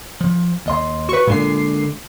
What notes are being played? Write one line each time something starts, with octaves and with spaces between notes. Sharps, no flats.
F3
D#2 D#5 C6
F#4 B4 C#6
A#2 D3 G#3 C7